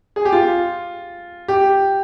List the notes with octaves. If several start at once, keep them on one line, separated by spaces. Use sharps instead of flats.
G#4
G4
F4
G4